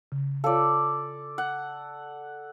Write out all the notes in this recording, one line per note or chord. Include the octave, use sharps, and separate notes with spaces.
C#3
F4 A4 C#5 D5 F5
F#5